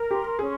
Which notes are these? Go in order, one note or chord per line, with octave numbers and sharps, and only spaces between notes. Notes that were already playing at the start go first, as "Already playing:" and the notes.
Already playing: A#4
G4 C6
C#4 G#4